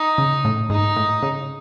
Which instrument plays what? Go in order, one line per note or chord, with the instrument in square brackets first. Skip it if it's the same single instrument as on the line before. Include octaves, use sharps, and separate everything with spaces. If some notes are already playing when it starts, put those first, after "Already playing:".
Already playing: [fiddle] D#4
[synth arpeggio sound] C#3
A2
[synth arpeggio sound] G#2 [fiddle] D#4
[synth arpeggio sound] A2
C#3